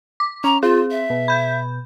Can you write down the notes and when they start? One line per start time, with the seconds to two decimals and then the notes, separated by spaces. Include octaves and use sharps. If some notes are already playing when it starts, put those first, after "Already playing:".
0.20 D6
0.44 C#4 A#5
0.63 C4 F4 G#4
0.91 E5
1.10 B2
1.28 B5 G6